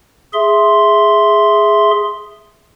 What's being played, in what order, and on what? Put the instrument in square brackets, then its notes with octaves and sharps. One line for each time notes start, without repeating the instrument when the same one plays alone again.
[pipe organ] G#4 E5 C6